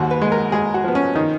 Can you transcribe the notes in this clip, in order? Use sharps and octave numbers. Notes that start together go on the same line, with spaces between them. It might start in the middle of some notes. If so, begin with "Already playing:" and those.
Already playing: D#2 G#2 F#4
B4
G#3
A#4
G#3 G#4
F#4
F3 B3
C#4
D#3 D#4